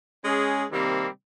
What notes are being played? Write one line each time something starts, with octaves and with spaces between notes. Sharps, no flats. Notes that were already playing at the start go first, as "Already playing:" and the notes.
G#3 C#4 G#4
C3 D#3 G3 A#3 C4